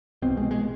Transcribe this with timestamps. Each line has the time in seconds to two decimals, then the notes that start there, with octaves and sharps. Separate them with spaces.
0.22 C2 B2 C4
0.37 G#3
0.51 G#3